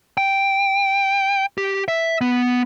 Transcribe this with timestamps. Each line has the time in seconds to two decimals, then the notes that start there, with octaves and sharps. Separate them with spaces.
0.18 G5
1.58 G4
1.88 E5
2.21 B3